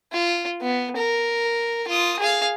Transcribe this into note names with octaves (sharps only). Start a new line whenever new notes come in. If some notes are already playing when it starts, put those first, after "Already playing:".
F4
B3
A#4
F4 D#6
G#4 F5